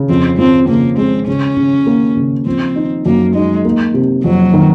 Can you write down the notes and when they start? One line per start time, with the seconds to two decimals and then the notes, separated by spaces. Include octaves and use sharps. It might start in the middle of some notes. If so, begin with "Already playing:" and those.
Already playing: C#3
0.09 F2 C4
0.38 F3 C4
0.68 C#3 A#3
0.97 G#3 C4
1.27 C#3 C#4
1.57 C#3
1.86 A#3
2.17 C#3
2.46 F3 C4
2.76 D#4
3.05 F#2 A#3
3.35 G#3 D#4
3.65 A#3
3.94 C3
4.24 F2 F#3
4.54 D#3